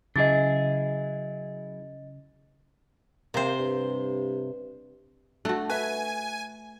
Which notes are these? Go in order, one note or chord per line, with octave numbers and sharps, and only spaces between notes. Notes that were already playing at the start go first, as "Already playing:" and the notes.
C#3 F#3 E4 G#4 D#5 A6
C3 A#3 C5
G2
A3 D4 F#4
B4 E5 G#5